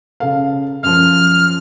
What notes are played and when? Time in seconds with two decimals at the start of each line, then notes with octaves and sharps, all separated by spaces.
0.20 C#3 A4 F5
0.83 F#2 F3 F6